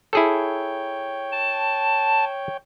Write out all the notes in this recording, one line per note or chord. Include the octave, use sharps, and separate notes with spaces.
E4 G#4 A4 C#5 G5
A5